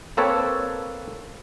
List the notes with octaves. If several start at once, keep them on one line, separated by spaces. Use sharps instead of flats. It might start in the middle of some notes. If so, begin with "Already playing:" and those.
A#3 C4 A4 B4 C#5